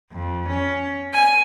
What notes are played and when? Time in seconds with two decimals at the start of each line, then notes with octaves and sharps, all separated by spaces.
0.11 F2
0.48 C#4
1.13 G#5